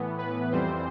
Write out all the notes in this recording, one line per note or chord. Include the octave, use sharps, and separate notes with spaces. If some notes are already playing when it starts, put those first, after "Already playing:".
Already playing: A2 E3 B3
B4
F2 E3 G3 C4 C5